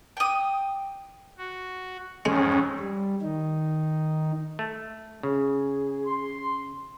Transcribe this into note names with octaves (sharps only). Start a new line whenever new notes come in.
G5 D#6
F#4
F2 G#2 G#3 C#4
G3
D#3 D#4
A3
C#3 G#4
C6